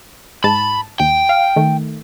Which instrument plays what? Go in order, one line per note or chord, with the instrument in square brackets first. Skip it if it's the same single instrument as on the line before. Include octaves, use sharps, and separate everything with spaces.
[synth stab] G#2 A5 [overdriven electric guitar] B5
[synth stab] D#2 [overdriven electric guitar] G5
[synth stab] F5
D#3 A3